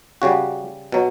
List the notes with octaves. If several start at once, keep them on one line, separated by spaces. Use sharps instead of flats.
C#3 G3 F#4
B2 F#3